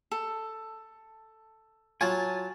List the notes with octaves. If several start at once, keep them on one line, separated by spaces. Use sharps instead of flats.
A4
F#3 F4 G#5 A5